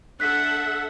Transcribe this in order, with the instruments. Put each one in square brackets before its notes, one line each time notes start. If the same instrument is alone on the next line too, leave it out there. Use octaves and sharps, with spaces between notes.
[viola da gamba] D4 [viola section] A4 E5 F#5 [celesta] F#6 B6